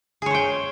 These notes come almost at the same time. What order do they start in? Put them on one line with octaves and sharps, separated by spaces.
G#4 C#5 C5 G5